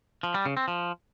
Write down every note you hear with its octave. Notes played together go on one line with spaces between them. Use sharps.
F3
G3
C#3
C4
F3